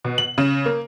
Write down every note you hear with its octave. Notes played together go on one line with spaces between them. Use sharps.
B2
F#7
C#3
A#3